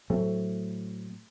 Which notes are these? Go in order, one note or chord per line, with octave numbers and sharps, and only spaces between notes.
A2 F#3 A3 C4